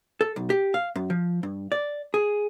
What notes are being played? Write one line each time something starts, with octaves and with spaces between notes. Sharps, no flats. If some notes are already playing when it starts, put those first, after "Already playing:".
A4
B1
G4
F5
F#2
F3
G2
D5
G#4